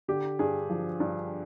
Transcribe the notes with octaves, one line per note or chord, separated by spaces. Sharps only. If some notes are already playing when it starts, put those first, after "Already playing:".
D3 G4
G2 G#4
F3
G2